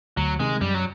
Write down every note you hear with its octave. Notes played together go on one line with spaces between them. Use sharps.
D2 F#3
C3 D#3 G#3
F#2 G3
F#3